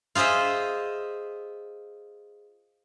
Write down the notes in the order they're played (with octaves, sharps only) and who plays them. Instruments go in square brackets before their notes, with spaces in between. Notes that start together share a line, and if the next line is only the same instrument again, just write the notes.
[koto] F4 G#4 C5 D#5 E5